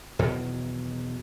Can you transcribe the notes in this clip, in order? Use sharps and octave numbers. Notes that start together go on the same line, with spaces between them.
E2 B2 D#3 F#3